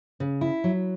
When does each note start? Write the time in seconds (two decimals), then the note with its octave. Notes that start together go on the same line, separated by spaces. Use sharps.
0.20 C#3
0.41 E4
0.64 F#3